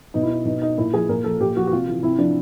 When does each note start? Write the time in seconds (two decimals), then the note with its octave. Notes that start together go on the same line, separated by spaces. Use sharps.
0.14 B2 D#4
0.23 E4
0.31 D#4
0.45 B2 D#4
0.62 D#4
0.78 A#2 E4
0.94 F3 G#4
1.09 A#2 A#4
1.24 F3 A4
1.40 A#2 G4
1.56 F3 F#4
1.67 F#4
1.71 C3 F4
1.88 E3
2.03 C3 E4
2.19 F3 D4